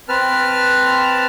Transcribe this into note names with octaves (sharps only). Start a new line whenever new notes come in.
C4 B4 A5 F6